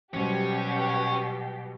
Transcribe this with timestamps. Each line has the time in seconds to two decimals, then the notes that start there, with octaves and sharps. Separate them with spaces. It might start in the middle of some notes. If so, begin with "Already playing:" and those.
0.14 B2 F#3 G3 C#4 G4 C5